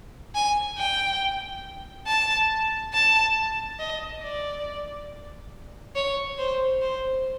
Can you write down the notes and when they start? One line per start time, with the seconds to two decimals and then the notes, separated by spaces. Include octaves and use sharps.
0.35 G#5
0.78 G5
2.07 A5
2.93 A5
3.79 D#5
4.23 D5
5.96 C#5
6.38 C5
6.81 C5